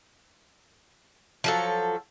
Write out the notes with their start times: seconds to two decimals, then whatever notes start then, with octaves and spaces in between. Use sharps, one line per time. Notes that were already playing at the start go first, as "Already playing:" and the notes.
1.44 F3 F#3 A4